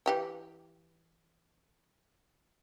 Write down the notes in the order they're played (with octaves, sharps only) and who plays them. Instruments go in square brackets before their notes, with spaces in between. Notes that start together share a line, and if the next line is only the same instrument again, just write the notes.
[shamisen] E3 G4 G5